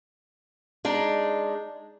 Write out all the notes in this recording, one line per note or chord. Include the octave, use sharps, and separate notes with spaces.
G#3 D4 D#4